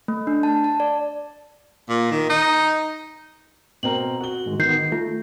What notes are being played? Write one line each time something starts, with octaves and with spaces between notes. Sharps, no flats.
A3
D4
A5
A5
D5
A#2
D#3
D#4
B2 C4 A#4 F#7
F#4 G7
G#2 D#3 G#3
D#3 B3 G6 C7
A3 F4